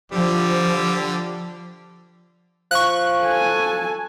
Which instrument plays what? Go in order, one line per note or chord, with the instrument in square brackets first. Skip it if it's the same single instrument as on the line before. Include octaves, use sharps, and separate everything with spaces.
[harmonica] D3 G3 G4 [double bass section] F3
[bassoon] F3 [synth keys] C#6 F#6
[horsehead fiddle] A4 G#5